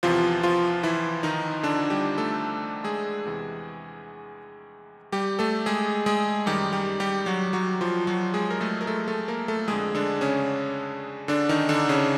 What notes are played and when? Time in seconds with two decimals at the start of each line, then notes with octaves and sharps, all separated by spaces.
0.03 E2 C3 E3 F3 F4
0.43 F3 F4
0.83 E3 E4
1.23 D#3 D#4
1.63 D3 D4
1.90 G3 G4
2.18 A3 A4
2.84 G#3 G#4
3.25 E2 C3 E3
5.12 G3 G4
5.39 A3 A4
5.66 G#3 G#4
6.06 G#3 G#4
6.46 F#2 D#3 G3 G4
6.73 G3 G4
7.00 G3 G4
7.26 F#3 F#4
7.53 F#3 F#4
7.81 F3 F4
8.07 F#3 F#4
8.34 G#3 G#4
8.50 A#4
8.61 A3 A4
8.81 A#4
8.87 A3 A4
9.08 A3 A4
9.28 A#3 A#4
9.48 A3 A4
9.68 F2 D3 G#3 G#4
9.95 D3 D4
10.21 C#3 C#4
11.28 D3 D4
11.49 D#3 D#4
11.69 D3 D4
11.89 C#3 C#4